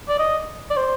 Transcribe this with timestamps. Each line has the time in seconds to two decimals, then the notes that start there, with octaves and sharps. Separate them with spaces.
0.09 D5
0.19 D#5
0.70 D5
0.76 C5